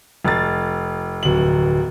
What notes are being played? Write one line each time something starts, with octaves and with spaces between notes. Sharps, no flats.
F1 A6
D1 F#7